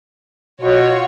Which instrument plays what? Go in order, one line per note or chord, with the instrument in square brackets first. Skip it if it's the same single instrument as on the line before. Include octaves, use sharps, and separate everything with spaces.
[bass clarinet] B2 [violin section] F4 F#4 C#5